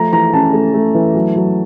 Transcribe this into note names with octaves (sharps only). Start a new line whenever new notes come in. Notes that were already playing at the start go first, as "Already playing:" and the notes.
Already playing: F3 A3 A#5
E3 A#5
C#4 A5
A3
A3
E3
F#3
F#3